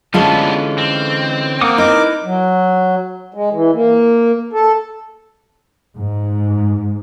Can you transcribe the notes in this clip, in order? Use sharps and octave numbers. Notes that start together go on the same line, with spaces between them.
D3 E3 G3 G#3 B3 C#4 F4 A4
C4
A#3 F#5 D6 D#6
D#4 E4 A#4 B4 D6
F#3
G#3
E3
A#3
A4
G#2